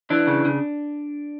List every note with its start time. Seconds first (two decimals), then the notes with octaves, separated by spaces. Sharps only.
0.10 E3 D4
0.27 C#3
0.45 C#3